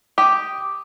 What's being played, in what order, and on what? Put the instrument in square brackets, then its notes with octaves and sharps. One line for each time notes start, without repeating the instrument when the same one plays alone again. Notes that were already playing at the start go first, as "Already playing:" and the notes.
[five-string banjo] G4 [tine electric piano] D6 D#6